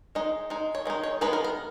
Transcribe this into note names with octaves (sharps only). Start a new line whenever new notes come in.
G#3 D#4 D#5
G#3 D#4
C#5
D#3 G#3 D#4
C#5
D#3 G#3 B3 D#4 B4
A#4
A#4